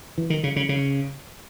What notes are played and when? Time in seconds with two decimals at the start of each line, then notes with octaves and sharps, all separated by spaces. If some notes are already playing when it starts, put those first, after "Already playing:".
0.18 E3
0.30 D#3
0.43 C#3
0.56 C#3
0.69 C#3